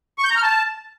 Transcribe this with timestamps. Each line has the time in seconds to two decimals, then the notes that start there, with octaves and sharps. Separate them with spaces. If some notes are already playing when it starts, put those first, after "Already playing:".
0.18 C#6
0.24 G6
0.30 A#5
0.37 F6
0.43 A5